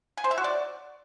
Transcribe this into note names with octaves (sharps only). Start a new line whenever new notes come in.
G#5
C5
E5
F#4
D5